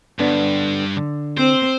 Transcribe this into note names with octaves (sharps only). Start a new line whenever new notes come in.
G2 D3 B3 D4
D3
C4 C5